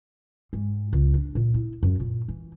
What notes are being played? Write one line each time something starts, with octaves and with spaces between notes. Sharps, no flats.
G#2
C#2
D4
A#2
E4
F#2
A#2
E3